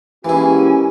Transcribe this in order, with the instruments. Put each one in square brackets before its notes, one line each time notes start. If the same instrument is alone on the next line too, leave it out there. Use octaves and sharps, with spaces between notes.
[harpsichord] E3 E4 [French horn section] G#3 A#3 G4 [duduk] C#4 [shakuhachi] G#5